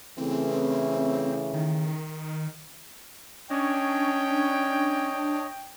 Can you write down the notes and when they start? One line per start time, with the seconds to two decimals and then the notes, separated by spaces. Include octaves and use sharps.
0.18 C#3 E3 A3 C4
1.54 D#3
3.50 C#4 D4 C#5 D#5 G5